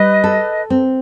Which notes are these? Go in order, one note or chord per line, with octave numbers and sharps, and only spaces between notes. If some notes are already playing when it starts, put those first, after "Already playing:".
Already playing: G3 B4 D#5
A4
C4